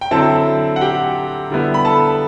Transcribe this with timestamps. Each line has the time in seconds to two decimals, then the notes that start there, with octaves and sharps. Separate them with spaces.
0.01 G5
0.11 D3 F#3 C4 E4 A4 A5
0.76 F#5
0.81 G4 G5
1.50 D3 G3 B3 E4
1.74 B5
1.85 A4 A5